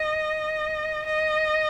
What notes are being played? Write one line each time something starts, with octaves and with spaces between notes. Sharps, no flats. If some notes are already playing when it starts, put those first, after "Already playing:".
Already playing: D#5
D#5